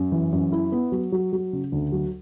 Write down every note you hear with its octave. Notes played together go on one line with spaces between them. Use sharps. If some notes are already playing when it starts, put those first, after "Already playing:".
Already playing: F#2
E3
F#2
E4
B3
F#3
F#3
F#3
C#3
D2
F#3